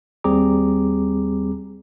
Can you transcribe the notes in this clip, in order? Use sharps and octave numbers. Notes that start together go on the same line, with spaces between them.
D#2 G3 C4 G#4 A#5 D6